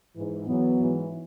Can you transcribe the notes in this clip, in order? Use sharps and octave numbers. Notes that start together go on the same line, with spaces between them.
G#2 E3
E2 E3 F#3 B3
G#2 E3